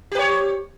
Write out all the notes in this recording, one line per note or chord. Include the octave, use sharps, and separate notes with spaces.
G4 B4 C#5